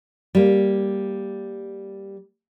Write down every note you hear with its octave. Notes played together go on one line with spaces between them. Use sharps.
G3 A#3